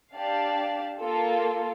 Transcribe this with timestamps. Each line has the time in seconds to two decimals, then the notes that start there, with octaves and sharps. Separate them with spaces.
0.15 D4 G4 D5 F5 A5
1.00 A#3 F4 A4